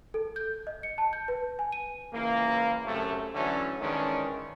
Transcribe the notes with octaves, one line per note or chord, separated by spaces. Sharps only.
A4
G6
D#5
C#7
A5
G6
B4
G#5
D#7
C#2 E3 A#3
F#2 C3 A3
D3 E3 F#3 A3 C#4
D#3 E3 G#3 C#4 D4